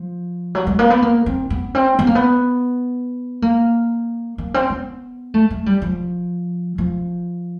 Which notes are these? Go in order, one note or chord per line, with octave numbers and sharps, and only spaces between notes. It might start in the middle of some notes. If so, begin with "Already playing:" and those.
Already playing: F3
F#3
G#3
A#3
B3
A#3
C4
B3
C4
B3
A#3
B3
A#3
A#3
C4
B3
A3
A3
G3
F3
F3